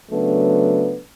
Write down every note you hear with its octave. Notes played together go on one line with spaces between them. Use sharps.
C#3 F#3 A3 B3 D4